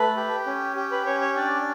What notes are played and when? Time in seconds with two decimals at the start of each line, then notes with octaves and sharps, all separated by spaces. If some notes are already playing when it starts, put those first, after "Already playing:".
Already playing: A3 B4
0.16 G4
0.46 C#4
0.76 G4
0.92 B4
1.06 C#4 C#5
1.21 C#5
1.36 D4 D5